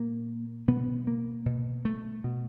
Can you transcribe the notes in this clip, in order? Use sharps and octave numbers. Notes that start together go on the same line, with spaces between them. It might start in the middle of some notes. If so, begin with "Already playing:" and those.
Already playing: A#2 A#3
B2 B3
A#3
B2
A3
B2